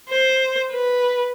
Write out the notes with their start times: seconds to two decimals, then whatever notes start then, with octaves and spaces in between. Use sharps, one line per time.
0.10 C5
0.72 B4